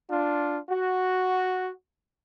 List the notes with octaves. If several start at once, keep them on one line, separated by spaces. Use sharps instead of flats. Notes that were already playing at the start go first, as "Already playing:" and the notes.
D4 F4
F#4